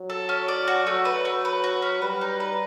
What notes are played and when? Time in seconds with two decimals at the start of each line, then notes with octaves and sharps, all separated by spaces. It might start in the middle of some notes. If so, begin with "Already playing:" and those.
Already playing: F#3
0.10 A4
0.29 C#4
0.48 D5
0.67 F#4
0.87 F#3 A3
1.05 B4
1.25 A3
1.45 B4
1.64 F#4
1.82 C#4
2.01 G3 B4
2.21 D#4
2.40 B4